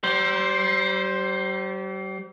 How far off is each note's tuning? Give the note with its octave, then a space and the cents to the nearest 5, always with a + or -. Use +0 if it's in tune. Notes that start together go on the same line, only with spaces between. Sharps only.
G3 -40 C5 +5